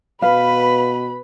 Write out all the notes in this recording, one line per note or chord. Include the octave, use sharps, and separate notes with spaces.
B2 B4 F5 B5